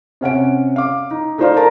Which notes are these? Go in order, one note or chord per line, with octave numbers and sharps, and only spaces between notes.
C3 C#4 F#5 D7
F5 D6
D#4
A3 D#4 F4 C5 D5 F5
A#4 A5 A#5